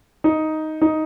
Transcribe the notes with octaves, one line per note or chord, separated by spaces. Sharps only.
D#4
D#4